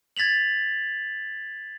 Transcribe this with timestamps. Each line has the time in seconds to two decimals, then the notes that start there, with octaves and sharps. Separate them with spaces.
0.17 G#6 A6 B6 F7 F#7